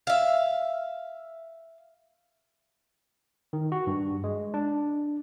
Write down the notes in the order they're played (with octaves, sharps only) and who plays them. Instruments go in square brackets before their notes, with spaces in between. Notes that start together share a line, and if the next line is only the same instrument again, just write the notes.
[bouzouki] E5 F5
[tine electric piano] D#3
F#4
G2
G#3
D4